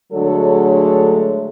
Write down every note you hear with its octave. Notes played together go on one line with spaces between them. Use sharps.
D3 F#3 G#3 A3 A4 C#5